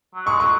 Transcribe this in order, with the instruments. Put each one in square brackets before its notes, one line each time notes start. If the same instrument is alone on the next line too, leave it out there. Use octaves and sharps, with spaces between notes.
[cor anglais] F#3
[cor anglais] G#3 [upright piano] C#6
[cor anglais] F#3 [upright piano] C#6